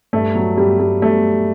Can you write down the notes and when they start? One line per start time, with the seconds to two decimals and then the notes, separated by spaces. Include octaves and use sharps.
0.13 G2 A3
0.35 F#3
0.57 G2 G3
0.80 G3
1.02 G2 A3